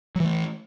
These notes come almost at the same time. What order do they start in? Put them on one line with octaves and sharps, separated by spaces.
F#3 E3 A3